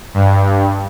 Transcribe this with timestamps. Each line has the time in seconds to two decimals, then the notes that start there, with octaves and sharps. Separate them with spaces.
0.14 G2